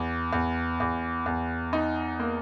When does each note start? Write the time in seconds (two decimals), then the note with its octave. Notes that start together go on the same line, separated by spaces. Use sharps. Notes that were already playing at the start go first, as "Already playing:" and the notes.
Already playing: E2
0.33 E2
0.80 E2
1.26 E2
1.73 D#4
2.20 A#3